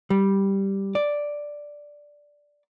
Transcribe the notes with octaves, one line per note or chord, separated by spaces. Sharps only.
G3
D5